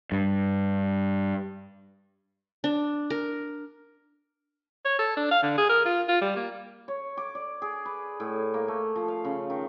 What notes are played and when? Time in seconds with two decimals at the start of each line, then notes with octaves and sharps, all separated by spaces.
0.12 G2
2.64 D4
3.10 A#4
4.85 C#5
4.99 A4
5.17 D4
5.31 F5
5.43 D3
5.58 G#4
5.69 A#4
5.85 F4
6.09 F4
6.21 G3
6.36 A#3
6.88 C#5
7.17 D6
7.35 D5
7.62 G#4
7.85 B4
8.20 A2
8.54 A#3
8.68 A3
8.96 F3
9.08 F5
9.25 C#3
9.50 D#3